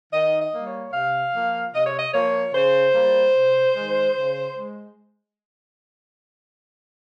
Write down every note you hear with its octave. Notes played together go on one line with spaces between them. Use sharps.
D#3 D#5
D#5
G3 A#3
C#5
C3 F5
F3 A#3
C3 D#5
C#5
D#5
F3 A#3 C#5
C#3 C5
G3 A#3
C3
D#3 G#3
C#3
G#3